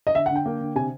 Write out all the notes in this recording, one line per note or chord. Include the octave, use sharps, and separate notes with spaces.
D#5
D3 E5
F#5
D3 G5
A#3
D3
C3 G#5